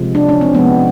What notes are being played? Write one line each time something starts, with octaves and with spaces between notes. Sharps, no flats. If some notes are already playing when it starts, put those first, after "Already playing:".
Already playing: C3 F3 G#3
D4
C#4
C4
C3 F3 G#3 B3